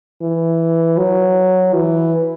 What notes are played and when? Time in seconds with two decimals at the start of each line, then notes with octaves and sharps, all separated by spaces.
0.22 E3
0.97 F#3
1.74 E3